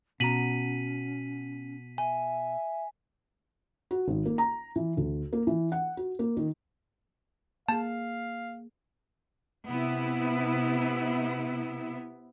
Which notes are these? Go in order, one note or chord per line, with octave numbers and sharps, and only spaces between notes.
B2 C#4 F#4 A#5 B6 D#7 F#7
E5 G#5
F#4
G#1
A#3
A#5
E3
D2
A#3
E3
F#5
F#4
A#3
D#3
A#3 G#4 F5 A5
C3 B3 E4